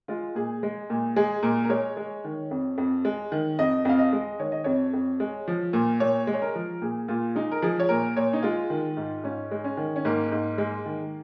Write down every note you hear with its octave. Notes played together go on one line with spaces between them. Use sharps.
G#3 F4
A#2 G#4
G#3
A#2
G#3 G#4
A#2 A#4
A#4
G#3 C#5
G#3
D#3
F2
F2
G#3
D#3
F2 D#5
F2 F5
D#5
G#3
D#3 C#5
D#5
F2 C#5
F2
G#3
F3
A#2
A#2 C#5
G#3
C#5
A#4
F3
A#2 G#4
A#2 F4
G#3 D#4
A#4
F3 G#4
C#5
A#2 A#4
A#2 C#5
D#4
G#3 F4
D#3
G#2
G#2 C#4
G#3
C#4
D#3
C#4
G#2 A#3
G#2
G#3
D#3